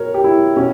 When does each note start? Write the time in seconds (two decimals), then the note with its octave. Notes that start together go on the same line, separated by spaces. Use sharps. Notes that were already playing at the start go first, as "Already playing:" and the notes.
Already playing: B2 A#4 C#5
0.14 G4
0.24 E4
0.56 B2 C#4